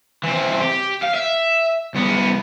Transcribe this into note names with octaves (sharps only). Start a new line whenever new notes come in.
E3 C4
G4
F5
E5
C2 B3